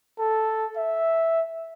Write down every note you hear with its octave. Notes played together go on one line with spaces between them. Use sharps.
A4
E5